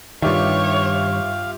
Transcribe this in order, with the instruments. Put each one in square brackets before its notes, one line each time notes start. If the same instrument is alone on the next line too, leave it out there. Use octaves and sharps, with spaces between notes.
[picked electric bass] G2 D#3 [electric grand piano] F4 G4 E5 [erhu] C#5 [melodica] F5